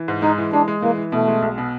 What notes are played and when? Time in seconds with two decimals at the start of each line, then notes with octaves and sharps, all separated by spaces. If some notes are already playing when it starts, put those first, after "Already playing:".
Already playing: E3
0.08 G#2
0.22 G#3 D#4
0.38 E3
0.53 G#3 D4
0.68 G#3
0.82 E3 A#3
0.98 E3
1.12 B2 A3
1.28 G#3
1.42 B1
1.58 B2